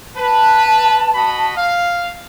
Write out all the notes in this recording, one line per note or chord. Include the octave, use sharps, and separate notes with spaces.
B4 A5
F#4 D#5 B5
F5